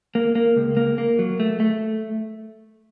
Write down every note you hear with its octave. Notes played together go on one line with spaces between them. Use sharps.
A#3
A#3
C#2
A#3
A#3
F#3
A3
A3